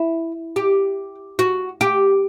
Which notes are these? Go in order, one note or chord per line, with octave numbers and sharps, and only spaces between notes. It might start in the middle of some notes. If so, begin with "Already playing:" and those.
Already playing: E4
G4
F#4
G4